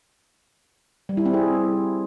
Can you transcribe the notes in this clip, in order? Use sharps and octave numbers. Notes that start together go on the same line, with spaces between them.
G3
E4
C4
G#4